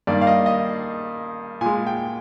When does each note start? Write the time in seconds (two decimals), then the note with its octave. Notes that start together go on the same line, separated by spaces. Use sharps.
0.07 G2 D#3 A#3 D5
0.21 F5
0.27 D#5
0.46 D#5
1.61 A#2 G#3 G#5
1.87 G5